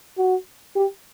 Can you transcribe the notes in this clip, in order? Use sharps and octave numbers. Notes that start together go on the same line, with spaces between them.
F#4
G4